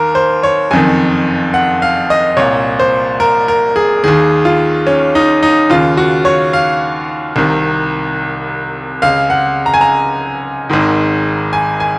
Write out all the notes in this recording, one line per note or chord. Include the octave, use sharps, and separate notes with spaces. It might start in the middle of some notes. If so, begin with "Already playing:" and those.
Already playing: D#2 A#4
C5
C#5
F#1 F2 D#3 G#5
F#5
F5
D#5
C2 A#2 C#5
C5
A#4
A#4
G#4
D#2 D#3 G#4
F4
C#4
D#4
D#4
D#2 C#3 F4
F#4
C#5
F5
C2 C3 D#3
C#2 C#3 F5
F#5
A#5
G#5
A#5
G#1 G#2 D#3
G#5
G#5